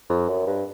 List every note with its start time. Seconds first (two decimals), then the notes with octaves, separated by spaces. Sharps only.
0.10 F2
0.29 F#2
0.46 G2